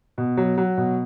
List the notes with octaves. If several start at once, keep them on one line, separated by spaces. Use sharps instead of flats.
B2
F#3
F#3
B2